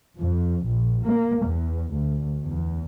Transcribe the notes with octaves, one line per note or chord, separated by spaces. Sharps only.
F2
A#1
A#3
E2
D2
E2